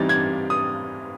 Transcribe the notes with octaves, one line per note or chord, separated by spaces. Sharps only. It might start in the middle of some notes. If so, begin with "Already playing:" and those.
Already playing: E3 G3 C4 D#4 A6
G#6
D#6